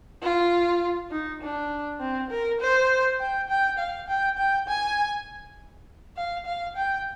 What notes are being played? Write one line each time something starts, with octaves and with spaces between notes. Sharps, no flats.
F4
D#4
D4
C4
A#4
C5
G5
G5
F5
G5
G5
G#5
F5
F5
G5